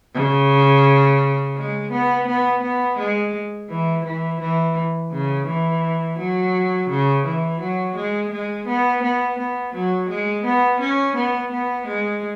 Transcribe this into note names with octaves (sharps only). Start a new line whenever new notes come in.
C#3
G#3
B3
B3
B3
G#3
E3
E3
E3
C#3
E3
F#3
C#3
E3
F#3
G#3
G#3
B3
B3
B3
F#3
G#3
B3
C#4
B3
B3
G#3